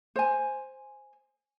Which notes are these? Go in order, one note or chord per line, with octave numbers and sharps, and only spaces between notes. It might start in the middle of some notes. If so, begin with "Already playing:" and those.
C5 G#5